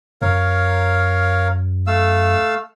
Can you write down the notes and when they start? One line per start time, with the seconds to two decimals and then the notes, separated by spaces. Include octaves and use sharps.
0.22 F#2 A#4 C#5 F5
1.87 A3 F5 E6